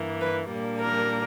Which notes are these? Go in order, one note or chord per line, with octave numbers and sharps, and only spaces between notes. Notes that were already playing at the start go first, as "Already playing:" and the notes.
Already playing: G2 E3 A#3
B4
A#2 G3 A#3 D4
A#4